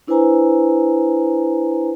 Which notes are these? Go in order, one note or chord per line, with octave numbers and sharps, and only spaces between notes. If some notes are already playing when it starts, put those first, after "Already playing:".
D4 E4 B4 C5 G#5 A#5